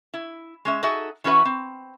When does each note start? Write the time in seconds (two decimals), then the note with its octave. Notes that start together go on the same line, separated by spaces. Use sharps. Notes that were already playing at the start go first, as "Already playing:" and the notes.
0.14 E4
0.65 G#3 C#4 E5
0.83 D#4 F#4 G#4 A4 E5
1.24 E3 C#4 F#4 B4 E5
1.45 C4